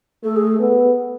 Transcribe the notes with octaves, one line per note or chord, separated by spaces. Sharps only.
A3 A4
G#4
B3